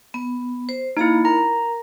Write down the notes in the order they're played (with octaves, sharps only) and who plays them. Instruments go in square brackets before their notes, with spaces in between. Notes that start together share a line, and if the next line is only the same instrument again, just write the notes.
[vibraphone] B3
C5
[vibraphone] A#3 F5 A#5 [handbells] D#4 E4
[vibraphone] A#4 [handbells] A#5